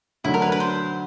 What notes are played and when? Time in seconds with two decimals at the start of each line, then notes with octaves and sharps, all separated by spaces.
0.24 D2 D3 F#3 E4
0.34 A#4
0.42 B4
0.52 B4
0.60 C5